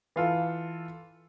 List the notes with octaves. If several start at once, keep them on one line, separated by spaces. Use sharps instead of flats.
E3 F4 A4